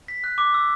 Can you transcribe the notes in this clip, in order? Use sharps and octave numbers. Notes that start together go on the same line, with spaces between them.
B6
F#6
D6
E6